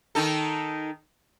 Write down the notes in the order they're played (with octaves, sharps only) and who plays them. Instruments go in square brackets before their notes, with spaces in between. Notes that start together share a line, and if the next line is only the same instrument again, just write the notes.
[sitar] D#3 D#4 A4